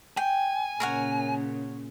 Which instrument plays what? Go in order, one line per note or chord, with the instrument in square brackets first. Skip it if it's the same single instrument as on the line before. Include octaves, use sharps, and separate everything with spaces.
[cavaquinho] G5 [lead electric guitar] G#5
[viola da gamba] A#2 C#3 [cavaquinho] A#4 C#5 F#5